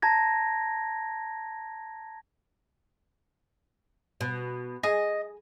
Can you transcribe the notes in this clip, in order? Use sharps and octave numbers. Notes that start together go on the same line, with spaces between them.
A5 A#5 G#6 A#6
B2
G#4 D#5